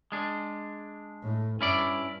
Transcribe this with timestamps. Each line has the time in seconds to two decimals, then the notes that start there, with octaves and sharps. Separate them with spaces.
0.12 G#3 D4
1.22 A2
1.61 G2 C#4 E4 D5